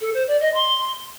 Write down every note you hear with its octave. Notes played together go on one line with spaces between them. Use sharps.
A4
C5
D5
D#5
C6